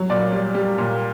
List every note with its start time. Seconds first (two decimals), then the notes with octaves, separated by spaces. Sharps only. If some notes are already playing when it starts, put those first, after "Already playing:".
Already playing: F#3
0.09 A#2 D5
0.32 G3
0.54 G3
0.78 A#2